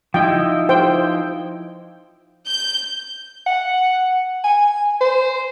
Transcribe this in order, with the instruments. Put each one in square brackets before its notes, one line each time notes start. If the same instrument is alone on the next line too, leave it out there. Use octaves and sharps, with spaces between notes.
[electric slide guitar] F3 D#4 E4 [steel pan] G5
[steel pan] C5 G5
[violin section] G6
[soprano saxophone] F#5
G#5
C5